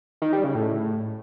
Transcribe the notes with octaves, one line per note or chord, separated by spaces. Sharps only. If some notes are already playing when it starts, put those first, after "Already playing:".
D#3
G3
C#3
A2